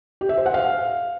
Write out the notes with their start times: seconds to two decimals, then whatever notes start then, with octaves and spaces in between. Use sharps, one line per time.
0.21 G4
0.29 E5
0.38 C5
0.46 F#5
0.54 F5